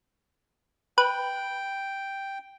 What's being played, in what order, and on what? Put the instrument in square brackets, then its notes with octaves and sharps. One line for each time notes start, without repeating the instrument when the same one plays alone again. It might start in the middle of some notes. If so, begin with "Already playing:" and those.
[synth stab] B4 [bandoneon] G5